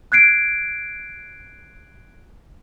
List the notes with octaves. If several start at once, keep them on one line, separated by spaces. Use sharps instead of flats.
F#6 G#6 C7 D7